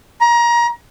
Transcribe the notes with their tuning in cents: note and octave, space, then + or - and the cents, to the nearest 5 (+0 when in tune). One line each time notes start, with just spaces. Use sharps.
A#5 +25